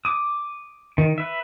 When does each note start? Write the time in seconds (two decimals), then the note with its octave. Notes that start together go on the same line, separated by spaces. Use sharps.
0.05 D6 D#6
0.98 D#3
1.18 B4 E5